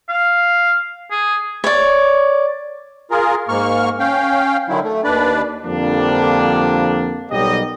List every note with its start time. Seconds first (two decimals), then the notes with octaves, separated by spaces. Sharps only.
0.09 F5
1.11 G#4
1.64 C#5 D5
3.11 F4 G#4 A#4
3.49 G#2 A#3 C#6 F6
3.99 C#4 F5 G5
4.69 D3 D#3 F#3 E4
4.84 A3
5.04 D#2 D4 B4 D5
5.64 F2 D3 F3 G3 A#3 D4
7.31 B1 F#3 G3 G4 A#4 D#5